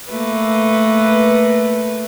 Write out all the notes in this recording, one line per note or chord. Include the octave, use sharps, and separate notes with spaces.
A3 A#3 B4